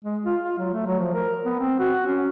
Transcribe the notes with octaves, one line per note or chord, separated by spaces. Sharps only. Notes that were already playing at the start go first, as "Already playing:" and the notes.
G#3
F4
F4
F#3
A3
F#3
F3
A#4
B3
C4
F#4
C#4